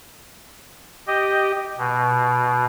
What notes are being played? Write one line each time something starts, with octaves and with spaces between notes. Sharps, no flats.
G4 D#5
B2